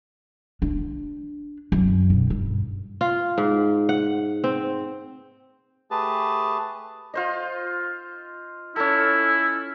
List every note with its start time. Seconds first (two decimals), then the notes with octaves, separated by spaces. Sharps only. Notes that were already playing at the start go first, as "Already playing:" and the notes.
0.62 D4
1.72 F#2
2.10 B1
2.30 G2
3.01 F4
3.38 G#2
3.89 F#5
4.44 C4
5.91 A3 G4 G#4 B4 A5
7.14 F4 C5 D#5
8.76 C#4 E4 A4